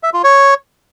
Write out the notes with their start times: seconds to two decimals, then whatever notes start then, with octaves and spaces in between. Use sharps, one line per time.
0.03 E5
0.14 F4
0.24 C#5